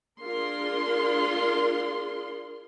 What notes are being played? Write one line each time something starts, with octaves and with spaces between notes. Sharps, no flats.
D4 F4 G#4 A#4 C6